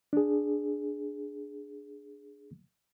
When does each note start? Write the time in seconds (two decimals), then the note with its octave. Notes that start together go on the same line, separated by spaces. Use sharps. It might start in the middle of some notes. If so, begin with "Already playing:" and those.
0.13 D4 G#4